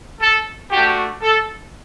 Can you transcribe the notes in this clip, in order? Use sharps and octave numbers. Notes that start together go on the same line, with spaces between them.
A4
A3 D4 F#4 G4
A4